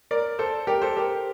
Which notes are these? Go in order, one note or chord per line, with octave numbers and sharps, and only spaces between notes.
A#4 D5
A4 C5
G4 A#4
A4 C5
G4 A#4